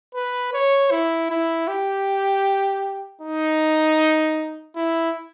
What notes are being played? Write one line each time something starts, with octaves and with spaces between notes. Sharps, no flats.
B4
C#5
E4
E4
G4
D#4
E4